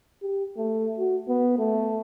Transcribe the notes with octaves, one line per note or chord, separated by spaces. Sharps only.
G4
A3
F#4
B3
A3